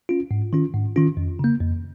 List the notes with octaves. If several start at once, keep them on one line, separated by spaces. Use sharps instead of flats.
C#4 F4
G#2
D#3 C#4 F4
G#2
D#3 C#4 F4
F2
C#3 A#3
F2